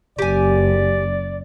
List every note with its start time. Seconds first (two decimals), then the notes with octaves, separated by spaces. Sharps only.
0.19 F#1 G4 D5 G#5